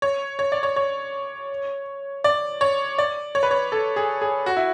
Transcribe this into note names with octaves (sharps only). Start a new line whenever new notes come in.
C#5
C#5
D5
C#5
C#5
D5
C#5
D5
C#5
B4
C#5
A4
G#4
G#4
F#4
E4